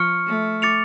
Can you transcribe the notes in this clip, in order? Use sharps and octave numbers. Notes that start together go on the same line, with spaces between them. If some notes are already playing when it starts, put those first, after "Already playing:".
Already playing: F3 C#6 F6 C#7
A3
D6 A6 C#7 F7